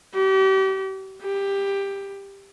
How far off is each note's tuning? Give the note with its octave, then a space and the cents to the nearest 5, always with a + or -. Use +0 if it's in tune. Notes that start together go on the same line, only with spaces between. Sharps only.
G4 -35
G4 +15